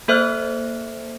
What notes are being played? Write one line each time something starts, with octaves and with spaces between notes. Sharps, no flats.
A#3 A4 C5 E5 F6 F#6